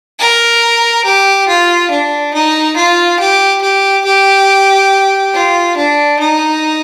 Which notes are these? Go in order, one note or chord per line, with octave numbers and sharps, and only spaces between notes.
A#4
G4
F4
D4
D#4
F4
G4
G4
G4
F4
D4
D#4